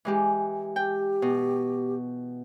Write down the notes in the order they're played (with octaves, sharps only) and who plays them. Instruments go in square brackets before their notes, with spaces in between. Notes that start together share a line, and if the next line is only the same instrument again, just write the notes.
[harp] E3 G#3 G4
[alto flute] G4 [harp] G5
[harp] B2